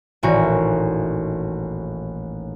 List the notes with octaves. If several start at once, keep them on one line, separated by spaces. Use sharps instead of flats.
D#1 A1 F#4